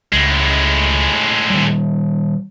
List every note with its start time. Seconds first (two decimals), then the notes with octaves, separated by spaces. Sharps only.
0.13 C#2 A2 G#3
1.50 D#3 G3